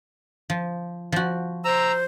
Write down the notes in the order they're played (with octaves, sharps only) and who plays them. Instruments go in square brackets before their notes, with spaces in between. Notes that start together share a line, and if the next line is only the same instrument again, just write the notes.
[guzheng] F3
F3 F#4
[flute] C5 [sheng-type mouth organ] A#5 E6